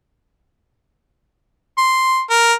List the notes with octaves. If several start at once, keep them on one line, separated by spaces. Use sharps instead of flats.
C6
A#4